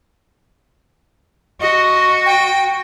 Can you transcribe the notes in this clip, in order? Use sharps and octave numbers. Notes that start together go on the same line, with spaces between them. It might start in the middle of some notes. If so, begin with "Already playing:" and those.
F#4 D#5
G5